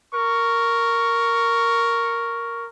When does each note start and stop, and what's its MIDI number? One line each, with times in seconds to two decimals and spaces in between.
0.13 2.66 70
0.13 2.66 85